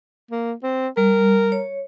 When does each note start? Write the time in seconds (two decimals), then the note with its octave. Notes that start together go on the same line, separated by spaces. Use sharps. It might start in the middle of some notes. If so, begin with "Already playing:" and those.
0.31 A#3
0.63 C4
0.97 G3 A#4
1.52 C#5